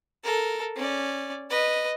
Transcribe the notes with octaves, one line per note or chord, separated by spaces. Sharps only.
A4 A#4
C#4 D5
B4 D#5